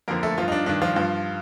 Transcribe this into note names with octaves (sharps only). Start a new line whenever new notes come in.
F2 D3 F3 A#3 A#4
A3 A4
G2 F3 F4
D#4
D4
G2 D#3 D4
F3 F4
G2 F3